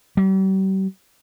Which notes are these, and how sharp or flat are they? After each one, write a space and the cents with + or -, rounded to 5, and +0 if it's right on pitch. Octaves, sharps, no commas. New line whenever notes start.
G3 -40